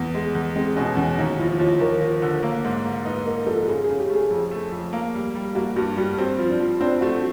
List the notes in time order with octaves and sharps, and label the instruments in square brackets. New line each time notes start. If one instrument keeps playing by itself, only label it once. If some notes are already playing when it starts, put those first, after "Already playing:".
Already playing: [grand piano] E2 [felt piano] B3
[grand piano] G#3
E2
[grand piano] G#3 [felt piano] C4
[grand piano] B2 [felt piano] C#4
[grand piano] E2 [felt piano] C#4
[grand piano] D#2 [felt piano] D#4
[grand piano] F3 [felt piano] E4
[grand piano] D#2 [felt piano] F4
[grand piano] D#2 [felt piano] A#4
[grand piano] F3
D3
A#3
G#2
A#3
[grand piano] D#4 [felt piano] B4
[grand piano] A#3 [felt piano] A#4
[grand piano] F3 [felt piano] A4
[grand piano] C#3 [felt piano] G#4
[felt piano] G#4
[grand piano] C#3
[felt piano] G4
[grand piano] A3 [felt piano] G#4
[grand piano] F2
A3
F2
A#3
G3
G3
[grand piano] A#3 [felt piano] F#4
[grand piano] G2 [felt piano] F#4
[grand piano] G3 [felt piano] F#4
[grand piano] C4 [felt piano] F#4
[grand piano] F3
[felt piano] D4
[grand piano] F3
[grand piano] C4 [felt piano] D4
[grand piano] A3 [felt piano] F#4